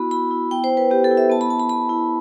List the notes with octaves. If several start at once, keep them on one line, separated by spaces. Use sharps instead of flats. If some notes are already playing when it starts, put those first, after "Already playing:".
Already playing: B3 E4 F#4 B5
E4 B5
E4
B3 G5
C5
B3
B4
B3 G4
A4
E4
E5
B3 A5
B5
B3 A5
B5
B3 B5
E4